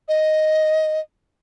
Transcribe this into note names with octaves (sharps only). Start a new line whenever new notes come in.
D#5